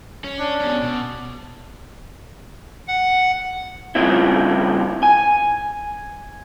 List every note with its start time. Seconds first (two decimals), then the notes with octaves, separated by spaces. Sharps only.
0.24 C#4
0.39 D4
0.61 B2 C#4
0.83 B2
2.88 F#5
3.95 G2 A#2 C#3 F3 C4 E4
5.03 G#5